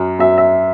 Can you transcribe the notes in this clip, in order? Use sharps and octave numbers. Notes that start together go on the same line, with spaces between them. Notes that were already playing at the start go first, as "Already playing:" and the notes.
Already playing: F#2
F#2 E5
E5